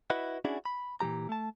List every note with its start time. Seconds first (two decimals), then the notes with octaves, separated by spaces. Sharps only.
0.10 E4 F#4 B4 D#5 F#5
0.45 C#4 D4 E4 F#4 G#4 D5
0.65 B5
1.01 A#2 E3 F3 G4 A#5
1.29 A3 A5